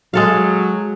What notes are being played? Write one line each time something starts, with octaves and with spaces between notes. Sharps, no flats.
F#3 G#3 A4 F5